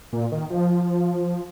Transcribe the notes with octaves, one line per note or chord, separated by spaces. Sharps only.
A#2
D#3
F3